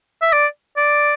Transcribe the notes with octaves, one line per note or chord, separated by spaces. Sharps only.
E5
D5
D5